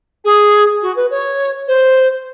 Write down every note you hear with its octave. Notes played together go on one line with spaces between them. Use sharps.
G#4
F#4
B4
C#5
C5